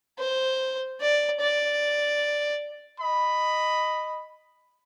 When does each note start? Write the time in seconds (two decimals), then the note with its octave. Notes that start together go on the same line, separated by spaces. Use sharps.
0.19 C5
1.01 D5
1.40 D5
3.00 D#5 B5